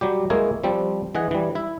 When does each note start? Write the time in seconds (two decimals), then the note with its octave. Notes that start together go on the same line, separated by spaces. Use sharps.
0.01 F#3 G3 G4
0.30 G#3 A#3 E4 G#4 A#4 C#5
0.64 F3 G3 C4
1.15 E3 G#4 D#5 F#5
1.31 E3 G3
1.55 E4 E5